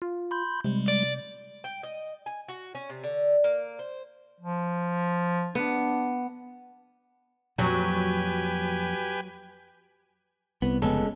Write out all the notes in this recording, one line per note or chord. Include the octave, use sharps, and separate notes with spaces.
F4
B5 C6 G6
C3 G3 G#3
D5
G5
D#5
G#5
F#4
C#4
C3
D3
A#3
C5
F3
B3 D4
F2 A#2 F3 F#3 G4 B4 G#5
C2 B3
F1 C#3 G#3 B3 C#4 A4